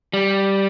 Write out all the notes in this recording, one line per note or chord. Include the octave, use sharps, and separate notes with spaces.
G3